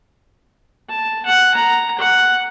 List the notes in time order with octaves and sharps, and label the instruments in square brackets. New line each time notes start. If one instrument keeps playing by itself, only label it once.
[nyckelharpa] A5
F#5
A#5
F#5